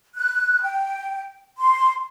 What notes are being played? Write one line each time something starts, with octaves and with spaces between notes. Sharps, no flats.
F#6
G5
C6